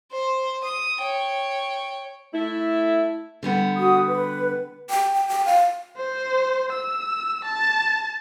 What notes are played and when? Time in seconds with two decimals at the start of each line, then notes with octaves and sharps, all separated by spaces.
0.12 C5
0.64 D#6
1.01 C#5 G5
2.33 A3 E4
3.43 D3 G3 B3
3.77 F#4 D#6
4.08 B4
4.90 G5
5.14 G5
5.28 G5
5.46 F5
5.97 C5
6.72 E6
7.45 A5